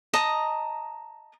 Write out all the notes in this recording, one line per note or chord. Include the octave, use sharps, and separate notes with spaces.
D#5 A5 A#5 D#6